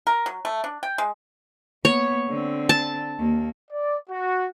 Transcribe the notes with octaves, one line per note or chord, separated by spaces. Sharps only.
A#4
F#3
A3
D4
G5
G#3
A#3 B3 C#5
D3 C4
A5
D#2 A#3
D5
F#4